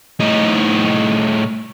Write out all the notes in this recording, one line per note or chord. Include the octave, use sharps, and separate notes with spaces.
A2 D#4